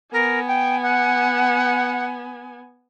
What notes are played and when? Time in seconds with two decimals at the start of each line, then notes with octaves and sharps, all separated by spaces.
0.13 B3 A#4 G#5
0.47 G5
0.83 F#5